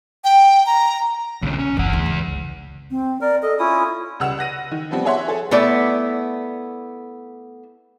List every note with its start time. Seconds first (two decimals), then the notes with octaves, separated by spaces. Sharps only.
0.24 G5
0.66 A#5
1.42 A#1 D#2 C#3
1.59 C#4
1.77 F#1 B1 E3 F#5
1.93 D2
2.06 C#2
2.91 C4
3.21 A#4 D5
3.42 A4 D#5
3.59 C#4 E4 F4 D#6
4.20 C#2 G3 F#5 E6 E7 F7
4.38 F#5 F#6 A#6 D#7
4.71 D#3
4.91 F3 G3 B3 C4
5.05 G#4 C#5 E5 F#5 C6
5.28 G#4 A4
5.51 A3 B3 E4 D5